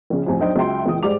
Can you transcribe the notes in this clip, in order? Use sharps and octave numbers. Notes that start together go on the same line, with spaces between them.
A#1 C#3
F2 A2 C3 G#5
B1 D4 D#4 C5 G5
C#2 F#3 E5 G5 C6
C#2 A#2 E3 G5 D#6
G#2 G3 D5 D6 F7